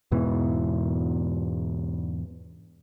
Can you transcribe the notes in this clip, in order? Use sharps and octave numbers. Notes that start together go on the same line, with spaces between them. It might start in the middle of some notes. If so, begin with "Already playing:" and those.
E2 G#2 B2 E3